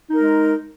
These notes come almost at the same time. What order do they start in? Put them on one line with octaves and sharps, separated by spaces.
D#4 A#4 G#3